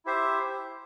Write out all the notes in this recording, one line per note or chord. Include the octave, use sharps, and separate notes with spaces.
E4 G4 C5 E5